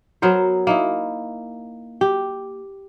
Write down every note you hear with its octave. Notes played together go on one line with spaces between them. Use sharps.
F#3 B3 A#4 C5
A#3 D#4 E4
G4